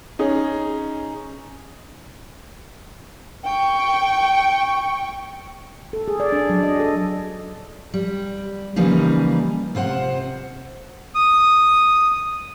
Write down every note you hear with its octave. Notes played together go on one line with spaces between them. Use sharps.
C#4 D#4 G#4
G5 C#6
A4
G#4
D5
D4
F#3
D#5
A4
G3
C#3 E3 F3 G3 A#3 D#4
C3 F4 C5 F#5
D#6